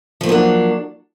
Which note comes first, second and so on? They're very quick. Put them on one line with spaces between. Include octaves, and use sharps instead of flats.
F3 A3 A#3 F#3 D4